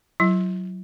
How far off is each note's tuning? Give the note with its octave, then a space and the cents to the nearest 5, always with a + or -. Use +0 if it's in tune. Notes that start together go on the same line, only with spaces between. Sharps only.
F#3 +0 E4 +35